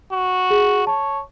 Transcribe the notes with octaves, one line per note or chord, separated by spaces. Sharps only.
F#4
G#4
C#5 A5